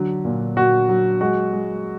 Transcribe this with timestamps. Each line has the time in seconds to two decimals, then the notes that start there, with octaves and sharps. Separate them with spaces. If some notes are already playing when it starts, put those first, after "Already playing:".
Already playing: D3 F#3
0.25 A#2
0.56 A#2 F#4
0.89 F#3
1.21 G#3 F#4
1.53 G#3